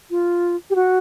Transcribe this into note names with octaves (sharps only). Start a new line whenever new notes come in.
F4
G4
F#4